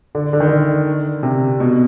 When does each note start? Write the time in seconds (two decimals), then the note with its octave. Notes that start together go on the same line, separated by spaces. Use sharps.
0.15 D3
0.33 D3
0.40 D#3
0.47 D3
1.23 C3
1.60 B2